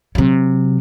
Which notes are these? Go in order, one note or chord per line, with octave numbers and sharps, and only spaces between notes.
C3 F#3